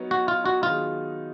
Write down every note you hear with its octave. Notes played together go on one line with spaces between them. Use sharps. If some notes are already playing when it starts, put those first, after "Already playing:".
Already playing: F#3 B3 D#4 A#4 C#5
F#4
F4
F#4
D#3 F#3 B3 D#4 F4 G#4